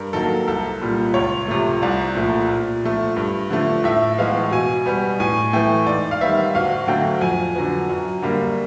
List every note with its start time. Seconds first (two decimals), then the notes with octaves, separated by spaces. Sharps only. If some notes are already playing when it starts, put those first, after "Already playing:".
Already playing: G2 A#4
0.13 D#3 F#3 A#3 A4
0.48 C2 A4
0.81 A#2 G3
1.14 C#2 C#5
1.48 C3 F3 A3
1.82 C2 D5
2.15 A#2 F3 A3
2.50 A#2
2.84 F3 A3
3.16 G2
3.50 D3 F3 A3
3.84 A2 E5
4.18 E3 G#3 B3 F5
4.51 B2 G#5
4.86 G3 B3
5.20 A2 G#5
5.53 E3 A3 G5
5.87 G#2 D5
6.11 F5
6.21 D#3 G3 B3 E5
6.55 D2 F5
6.87 D3 F#3 A3 G5
7.21 F2 G#5
7.55 D3 F#3 B3
7.89 F#2
8.22 D3 G3 A#3